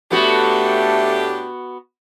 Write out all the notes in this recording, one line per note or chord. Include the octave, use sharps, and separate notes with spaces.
A2 A3 B3 D4 F#4 G4 A4